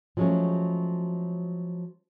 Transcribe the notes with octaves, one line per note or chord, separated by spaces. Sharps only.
F3 F#3 G#3 A3 C#4